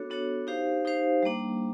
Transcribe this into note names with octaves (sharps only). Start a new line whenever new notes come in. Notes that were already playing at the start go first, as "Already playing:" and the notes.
Already playing: B3 D4 F#4 A4 C#5
B3 D4 F#4 A4 C#5
D#4 G4 C5 F5
D#4 G4 C5 F5
G3 A#3 D4